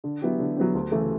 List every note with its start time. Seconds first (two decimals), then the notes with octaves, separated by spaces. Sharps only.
0.04 D3
0.22 F#3 B3 E4 G4
0.40 D3
0.57 F#3 B3 E4 G4
0.74 D2
0.92 C#3 E3 A3